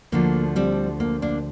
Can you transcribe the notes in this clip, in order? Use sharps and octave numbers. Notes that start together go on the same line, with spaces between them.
D2 D3 F3 A#3
G3 C4
A#3
A#3 D4